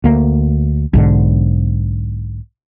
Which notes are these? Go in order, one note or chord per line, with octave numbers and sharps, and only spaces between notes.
D2 A#3
B1 G#2 D3